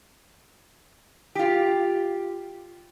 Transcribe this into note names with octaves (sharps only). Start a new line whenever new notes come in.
F4 G4